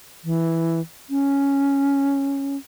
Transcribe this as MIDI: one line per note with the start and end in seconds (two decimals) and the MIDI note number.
0.24 0.80 52
1.10 2.56 61